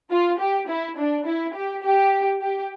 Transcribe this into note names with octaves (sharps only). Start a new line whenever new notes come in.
F4
G4
E4
D4
E4
G4
G4
G4